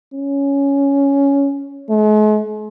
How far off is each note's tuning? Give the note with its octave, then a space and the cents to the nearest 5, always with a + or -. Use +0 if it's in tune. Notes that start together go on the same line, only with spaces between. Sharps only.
C#4 +10
G#3 +45